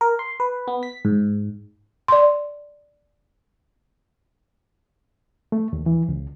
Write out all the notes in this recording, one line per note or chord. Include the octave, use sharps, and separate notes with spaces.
A#4
C6
B4
B3
B6
G#2
D5 C6
A3
D#2
E3
C#2